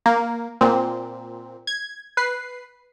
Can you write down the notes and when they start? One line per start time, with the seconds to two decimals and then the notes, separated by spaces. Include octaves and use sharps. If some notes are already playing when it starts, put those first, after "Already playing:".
0.06 A#3
0.61 A#2 C4
1.67 G#6
2.17 B4 C7